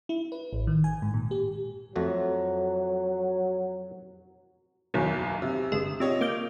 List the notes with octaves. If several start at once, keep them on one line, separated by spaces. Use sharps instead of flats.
E4
B4
A1
D#3
G#5
G#2
A#2
G4
F2 F#3 A3 F#4
F#1 B1 E2 B2 D#3 F#3
C3
G1 G#3 E7
C3 F4 C#5 D#5
A#3 D6 G6